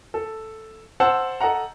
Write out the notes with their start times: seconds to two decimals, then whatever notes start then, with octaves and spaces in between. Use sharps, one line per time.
0.14 A4
1.00 C5 F#5 A5 E6
1.40 A4 D#5 F#5 A#5